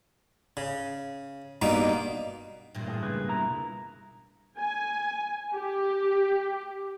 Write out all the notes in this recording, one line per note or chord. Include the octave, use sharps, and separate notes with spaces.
C#3
G2 B2 A#3 D#4
E2 G2 A#2
A2 G#4
C#2 G#4 B4
B2 E4 A#5
G#5
G4